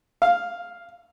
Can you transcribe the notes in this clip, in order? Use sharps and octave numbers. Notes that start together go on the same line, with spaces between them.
F5